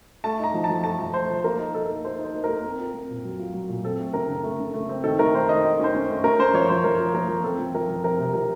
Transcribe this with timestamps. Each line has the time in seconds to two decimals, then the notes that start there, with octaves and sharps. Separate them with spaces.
0.24 A3 A5
0.40 D#4 A#5
0.54 F3
0.64 A5
0.70 F3
0.84 A3 A5
1.00 F3
1.14 A3 C5
1.30 F3
1.44 A#3 A#4
1.59 D#4
1.74 D#4 A4
1.89 A#3
2.04 A#3 C5
2.19 D#4
2.24 C5
2.34 A#3
2.44 A#4
2.49 A#3
2.64 C4
2.79 F4
2.94 C4
3.09 A#2
3.25 F#3
3.39 F4
3.54 F#3
3.69 A#2
3.84 C4 A4
3.99 A3
4.13 C#3 A#4
4.28 C#3
4.43 A3
4.60 C#3
4.74 A3
4.89 C4
5.04 D#3 A4
5.19 A3 A#4
5.34 D#3 C5
5.48 D#3 D#5
5.64 D#3
5.80 C#4 C5
5.95 C#4
6.09 A3
6.24 C#4 A#4
6.39 C#4 C5
6.54 F3 C#5
6.69 F3 C5
6.84 F3 A#4
6.99 F3
7.14 A#3 A#4
7.28 F3
7.43 C4 A4
7.58 F3
7.75 F3 A#4
7.89 F3
8.03 C4 A#4
8.19 C3
8.34 F3 A#4